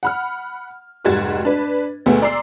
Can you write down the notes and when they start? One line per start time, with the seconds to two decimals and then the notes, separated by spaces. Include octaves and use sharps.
0.03 F#5 B5 F6
1.04 F1 G#2 G3 F#4 G#6 A6
1.45 D4 B4
2.06 D2 B2 G#3 A3 B3
2.22 D5 A#5 C6 E6 C7